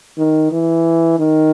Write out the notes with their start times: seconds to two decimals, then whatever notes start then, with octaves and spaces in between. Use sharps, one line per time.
0.17 D#3
0.52 E3
1.19 D#3